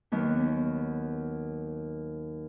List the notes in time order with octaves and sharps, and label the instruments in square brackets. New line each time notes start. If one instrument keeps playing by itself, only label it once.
[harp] D#2 D#3 F#3 B3